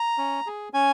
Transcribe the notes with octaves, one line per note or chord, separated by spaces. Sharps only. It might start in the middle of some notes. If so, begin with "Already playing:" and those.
Already playing: A#5
C#4
G#4
C#4 G#5